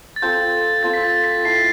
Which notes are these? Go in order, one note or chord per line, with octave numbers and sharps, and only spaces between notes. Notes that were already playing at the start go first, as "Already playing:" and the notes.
A6
C4 F4 A4 C5 G6
C4 F4 A4 C5 A6
B6
A6
B6
A3 E4 A4 C7